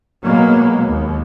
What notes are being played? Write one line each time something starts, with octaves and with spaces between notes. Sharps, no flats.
B2 F#3 G#3 A#3
D#2